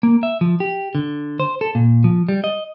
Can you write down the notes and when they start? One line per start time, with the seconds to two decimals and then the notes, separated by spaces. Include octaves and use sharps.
0.03 A#3
0.23 E5
0.41 F3
0.60 G4
0.95 D3
1.40 C5
1.61 A4
1.75 A#2
2.04 F3
2.29 G3
2.44 D#5